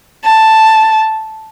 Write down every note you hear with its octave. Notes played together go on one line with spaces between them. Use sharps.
A5